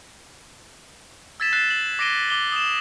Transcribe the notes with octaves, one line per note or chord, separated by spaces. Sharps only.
E6 G#6 A6 B6 E7
F#6 A6 C7 E7
F#7
D6 A#6 C7 D7 D#7 G7
D6 G7
D#6 E7